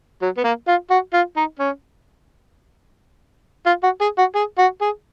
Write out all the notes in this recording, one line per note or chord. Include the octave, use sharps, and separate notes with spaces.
F#3
B3
A#3
F4
F#4
F4
D#4
C#4
F4
F#4
G#4
F#4
G#4
F#4
G#4